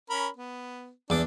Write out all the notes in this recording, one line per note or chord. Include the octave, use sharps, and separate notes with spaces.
C#4 A#4 B5
B3
E2 D4 D6